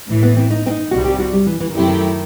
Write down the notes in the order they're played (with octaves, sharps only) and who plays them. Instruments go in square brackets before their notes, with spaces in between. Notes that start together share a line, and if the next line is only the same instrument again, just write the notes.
[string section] A1 A2 E3
[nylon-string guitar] B3
C4
D#4
C4
D#4
[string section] C2 C3 D#3 G3 [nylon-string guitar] F#4
[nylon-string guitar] G4
F#4
G3
E3
E3
D#3
[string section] F#2 F#3 A3 E4 G4 [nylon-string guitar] C3
[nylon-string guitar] D#3